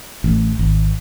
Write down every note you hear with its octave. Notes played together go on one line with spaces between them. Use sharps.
A1
G#1